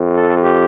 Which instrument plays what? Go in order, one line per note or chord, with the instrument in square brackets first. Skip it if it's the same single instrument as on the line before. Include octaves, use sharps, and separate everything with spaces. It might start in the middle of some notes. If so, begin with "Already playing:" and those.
Already playing: [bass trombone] F2
[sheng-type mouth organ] A4
G4